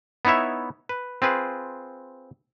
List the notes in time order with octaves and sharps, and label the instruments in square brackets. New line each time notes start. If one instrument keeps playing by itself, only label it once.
[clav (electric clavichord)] B3 D#4 E4 C#5 E5
B4
C4 F4 G#4 B4